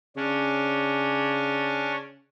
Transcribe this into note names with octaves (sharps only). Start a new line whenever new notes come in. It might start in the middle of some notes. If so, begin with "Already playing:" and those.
C#3 C#4 D4